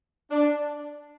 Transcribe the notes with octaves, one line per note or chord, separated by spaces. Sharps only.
D4